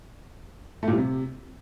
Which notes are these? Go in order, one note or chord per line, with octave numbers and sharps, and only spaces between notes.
A3
A#2
G3
C3